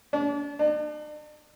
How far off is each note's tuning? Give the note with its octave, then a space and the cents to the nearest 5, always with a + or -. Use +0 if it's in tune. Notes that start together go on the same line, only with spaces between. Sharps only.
D4 -35
D4 +45